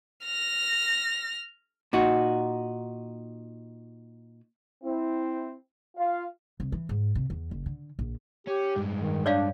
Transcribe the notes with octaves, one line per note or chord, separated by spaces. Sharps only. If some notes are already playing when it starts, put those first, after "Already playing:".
F6 A#6
A#2 D#4 F#4
C4 E4
F4 F5
C2
E3
G#2
C3
E2
F#1
D3
A#1
C#4 G4
G2 G#3
D#3
D4 C#5 D5 F5